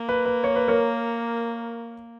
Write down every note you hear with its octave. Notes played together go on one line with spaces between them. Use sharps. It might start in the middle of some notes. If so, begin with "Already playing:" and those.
Already playing: A#3
B4
B4
C#5
B4
A#4 C#5